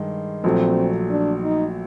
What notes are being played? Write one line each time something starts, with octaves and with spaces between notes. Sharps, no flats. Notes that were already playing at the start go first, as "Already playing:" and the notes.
Already playing: G2 D#3 G#3
A#1 A#2 F#3 A3 C4
D4
D#4